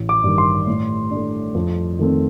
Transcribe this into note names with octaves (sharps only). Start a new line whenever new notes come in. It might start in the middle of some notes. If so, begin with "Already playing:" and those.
Already playing: A1
D6
G2 D#3
C6
A2
A3 D4
F2
D#3 A3 C4